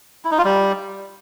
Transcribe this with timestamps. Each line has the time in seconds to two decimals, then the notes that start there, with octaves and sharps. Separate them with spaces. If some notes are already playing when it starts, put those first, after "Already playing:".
0.25 E4
0.31 D#4
0.38 F4
0.45 G3